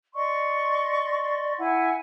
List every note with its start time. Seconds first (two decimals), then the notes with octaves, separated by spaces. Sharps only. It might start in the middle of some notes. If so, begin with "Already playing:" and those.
0.14 D5 D#5 C6 C#6
1.58 E4 F#5 G#5